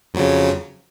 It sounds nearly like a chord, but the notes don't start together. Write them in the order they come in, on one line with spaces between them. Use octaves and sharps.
F2 F#3 C#3